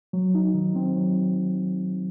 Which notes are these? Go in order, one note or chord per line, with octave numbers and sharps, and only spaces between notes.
F#3
D#4
D#3
C4
F#3